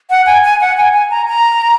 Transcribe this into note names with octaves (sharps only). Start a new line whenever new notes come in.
F#5
G#5
G#5
F#5
G#5
G#5
A#5
A#5